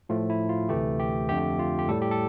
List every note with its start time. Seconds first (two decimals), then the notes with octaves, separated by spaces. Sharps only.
0.09 A2 F3 A3 F4
0.30 E4
0.49 F4
0.69 D2 C3 E3 A3 G4
0.99 G4
1.29 F2 D3 A3 G4
1.59 F4
1.79 G4
1.89 A2 G3 A4
2.02 G4
2.11 A4